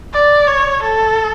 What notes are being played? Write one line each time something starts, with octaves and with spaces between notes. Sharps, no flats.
D5
C#5
A4